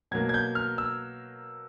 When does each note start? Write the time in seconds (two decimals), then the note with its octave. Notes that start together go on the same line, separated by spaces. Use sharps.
0.11 B2 F#3 A#3 G#6
0.29 G#6
0.34 G6
0.55 F6
0.78 E6